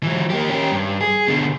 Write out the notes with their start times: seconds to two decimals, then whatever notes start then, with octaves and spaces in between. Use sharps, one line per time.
0.03 E3 F#3
0.30 A#3 G4
0.49 C#4 G4
0.71 G2
1.01 G#4
1.28 B2 D3